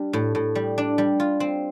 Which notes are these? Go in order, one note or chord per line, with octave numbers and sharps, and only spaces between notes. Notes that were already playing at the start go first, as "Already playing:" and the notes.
Already playing: G3 D4
A2
A2
G3
D4
G3
F4
C4